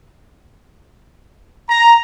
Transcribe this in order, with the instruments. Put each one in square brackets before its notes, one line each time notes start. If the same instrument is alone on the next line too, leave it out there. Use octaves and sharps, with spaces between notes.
[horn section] A#5